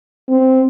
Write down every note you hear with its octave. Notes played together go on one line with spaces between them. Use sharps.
C4